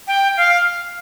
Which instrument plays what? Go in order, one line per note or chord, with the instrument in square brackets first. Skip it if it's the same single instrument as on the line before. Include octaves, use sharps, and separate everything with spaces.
[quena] G5
F5